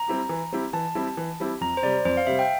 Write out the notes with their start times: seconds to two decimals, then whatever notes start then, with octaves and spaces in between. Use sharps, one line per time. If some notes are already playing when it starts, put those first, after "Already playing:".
Already playing: A#5
0.08 G3 C4 E4 G4
0.29 E3
0.52 G3 C4 E4 G4
0.73 E3 A5
0.95 G3 C4 E4 G4
1.17 E3
1.40 G3 C4 E4 G4
1.61 F2 A#5
1.77 C5
1.83 C3 G3 D5
2.05 F2 C5
2.17 F5
2.27 C3 G3 E5
2.39 G5